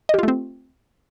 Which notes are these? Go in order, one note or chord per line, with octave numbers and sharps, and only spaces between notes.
A3 C4 F4 G4 D#5